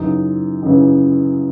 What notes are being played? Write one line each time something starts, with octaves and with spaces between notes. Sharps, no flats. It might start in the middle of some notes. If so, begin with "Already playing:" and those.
Already playing: F#2 C#3 E3 D#4
F#2 C#3 E3